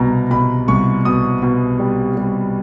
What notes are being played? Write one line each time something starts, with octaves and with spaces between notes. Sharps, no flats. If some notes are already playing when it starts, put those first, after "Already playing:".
Already playing: C2 B2 A#5
B2 B5
C2 C#6
B2 D#6
B2
G3
G3